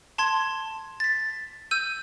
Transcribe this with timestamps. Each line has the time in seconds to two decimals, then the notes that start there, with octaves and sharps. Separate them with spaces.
0.18 A5 C6 G#6
1.00 A6 B6
1.71 E6 G6 D#7